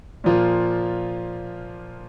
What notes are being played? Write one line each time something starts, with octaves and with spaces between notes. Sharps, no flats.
A#2 F3 A#3 F4